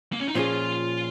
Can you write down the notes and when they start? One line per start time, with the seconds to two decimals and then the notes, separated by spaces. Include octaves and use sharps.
0.13 A#3
0.20 C#4
0.28 D#4
0.35 A#2 F3 C#4 F4 G#4